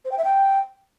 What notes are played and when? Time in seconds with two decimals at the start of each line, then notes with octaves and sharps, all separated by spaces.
0.05 C5
0.11 G5
0.18 E5
0.24 G5